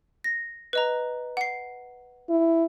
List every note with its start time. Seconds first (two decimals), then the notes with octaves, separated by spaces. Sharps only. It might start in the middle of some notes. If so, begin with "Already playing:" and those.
0.24 A#6
0.73 B4 D#5 A#5
1.37 F#5 C7
2.30 E4